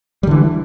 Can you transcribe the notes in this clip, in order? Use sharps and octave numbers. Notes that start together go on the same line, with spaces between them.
D3 E3 G3